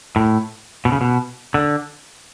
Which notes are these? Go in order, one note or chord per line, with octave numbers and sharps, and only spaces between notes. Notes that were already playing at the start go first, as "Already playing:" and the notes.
A2
B2
C#3
B2
D3